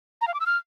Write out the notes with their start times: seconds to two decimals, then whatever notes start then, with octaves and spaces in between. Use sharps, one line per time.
0.21 A#5
0.27 F5
0.34 D6
0.40 E6
0.46 F6